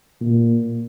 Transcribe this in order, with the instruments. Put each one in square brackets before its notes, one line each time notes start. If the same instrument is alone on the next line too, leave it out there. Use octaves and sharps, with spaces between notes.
[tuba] A#2